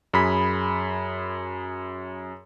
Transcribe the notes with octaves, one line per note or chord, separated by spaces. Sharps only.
F#2 G#4 B5 B6